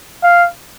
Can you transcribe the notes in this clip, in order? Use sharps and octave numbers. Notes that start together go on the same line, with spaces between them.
F5